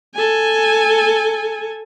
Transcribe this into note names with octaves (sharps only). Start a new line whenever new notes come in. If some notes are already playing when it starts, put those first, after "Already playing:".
A4 G#5